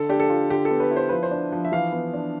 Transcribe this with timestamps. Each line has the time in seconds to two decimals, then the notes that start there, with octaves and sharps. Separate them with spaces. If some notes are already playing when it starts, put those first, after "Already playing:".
Already playing: D3 A4
0.09 D4 G4
0.20 A4
0.29 F4
0.50 D3 G4
0.65 B3 A4
0.80 B4
0.91 E4
0.96 C5
1.09 F3 B4
1.23 C5
1.31 D4
1.52 F3
1.65 E5
1.72 E3 F5
1.92 B3
2.14 D4